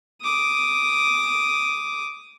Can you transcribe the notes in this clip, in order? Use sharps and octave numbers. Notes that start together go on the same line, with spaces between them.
D6 D#6